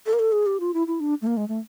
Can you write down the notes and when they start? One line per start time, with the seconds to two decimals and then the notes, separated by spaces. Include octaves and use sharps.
0.06 A4
0.13 A#4
0.19 A4
0.32 G#4
0.46 G4
0.60 F4
0.74 E4
0.87 E4
1.00 D4
1.22 A3
1.27 A#3
1.37 G#3
1.48 A3